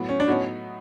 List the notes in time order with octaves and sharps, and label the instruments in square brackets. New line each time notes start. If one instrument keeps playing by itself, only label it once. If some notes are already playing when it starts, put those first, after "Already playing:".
Already playing: [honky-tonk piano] A2 F#3 B3
[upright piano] C#4
D4
[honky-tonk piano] A2 F#3 B3 D#4 F#4 [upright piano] C#4